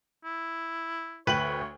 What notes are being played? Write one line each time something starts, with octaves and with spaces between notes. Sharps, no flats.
E4
D2 B4 C#5 G5 F#7